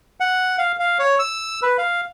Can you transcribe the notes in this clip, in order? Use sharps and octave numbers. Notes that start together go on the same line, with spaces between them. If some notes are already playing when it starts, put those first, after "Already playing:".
F#5
F5
F5
C#5
E6
B4
F5